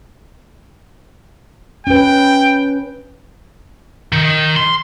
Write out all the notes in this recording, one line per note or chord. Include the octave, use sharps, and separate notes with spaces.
C#4 B4 G5
D#3
C6